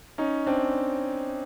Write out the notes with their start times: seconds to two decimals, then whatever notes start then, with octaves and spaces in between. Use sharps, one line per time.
0.18 C#4 D#4
0.47 C4 D4